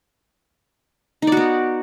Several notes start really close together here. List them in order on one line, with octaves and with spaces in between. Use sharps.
D#4 D5 F#4 B3